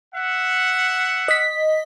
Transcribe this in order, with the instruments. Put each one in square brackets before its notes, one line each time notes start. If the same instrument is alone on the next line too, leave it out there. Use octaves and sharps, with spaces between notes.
[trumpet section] E5 F#5
[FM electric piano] D#5 B6